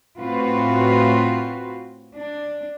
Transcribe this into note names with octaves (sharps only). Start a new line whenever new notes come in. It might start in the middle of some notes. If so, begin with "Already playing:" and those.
A2 C4 F4 F#4 B4
D4